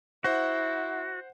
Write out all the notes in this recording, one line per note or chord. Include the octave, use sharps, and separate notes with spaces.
E4 F#4 C5 F#5